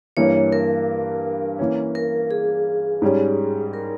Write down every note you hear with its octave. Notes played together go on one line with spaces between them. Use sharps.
G2 E3 A#3 C#5
A#4
E3 A#3 C#4
A#4
G#4
G#2 G3 C#4
A#4